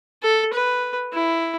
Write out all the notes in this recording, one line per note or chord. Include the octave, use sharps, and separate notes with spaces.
A4
B4
E4